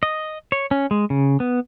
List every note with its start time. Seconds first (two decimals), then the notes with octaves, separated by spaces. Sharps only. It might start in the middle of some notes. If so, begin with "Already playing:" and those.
0.03 D#5
0.52 C#5
0.71 C#4
0.91 G#3
1.10 C#3
1.40 B3